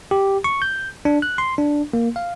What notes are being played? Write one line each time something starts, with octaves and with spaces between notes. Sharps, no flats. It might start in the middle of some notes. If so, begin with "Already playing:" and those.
G4
C#6
G6
D4
F#6
C6
D4
A#3
F5